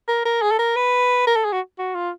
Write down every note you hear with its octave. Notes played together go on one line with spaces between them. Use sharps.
A#4
A#4
G#4
A4
A#4
B4
A#4
A4
G#4
F#4
F#4
F4